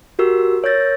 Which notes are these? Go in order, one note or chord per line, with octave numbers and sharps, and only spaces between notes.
F#4 G4 A#4 E6
A#4 C#5 E6 G6 A6 A#6